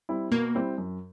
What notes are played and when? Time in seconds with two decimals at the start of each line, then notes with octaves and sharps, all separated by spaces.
0.09 G3 C4 E4
0.31 B2 A#3
0.55 G3 C4 E4
0.78 F#2